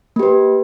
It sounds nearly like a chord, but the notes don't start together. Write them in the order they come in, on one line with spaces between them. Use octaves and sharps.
A#3 G4 B4